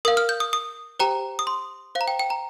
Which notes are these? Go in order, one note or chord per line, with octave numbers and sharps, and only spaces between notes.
A#4 F5 D#6
F6
G6
D#6
D#6
G4 C5 G5 A#5
D#6
C6
C5 F5
A#5
G5
G5
A#5